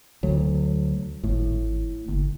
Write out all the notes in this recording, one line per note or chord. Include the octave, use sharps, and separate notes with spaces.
D2 F#3
G#1 A2
G1